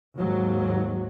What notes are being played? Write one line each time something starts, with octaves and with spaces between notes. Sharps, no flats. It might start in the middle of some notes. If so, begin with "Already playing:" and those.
D#2 G#2 F#3